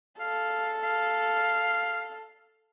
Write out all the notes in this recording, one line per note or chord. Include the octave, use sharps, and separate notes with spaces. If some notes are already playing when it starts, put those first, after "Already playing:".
A4 F5
F5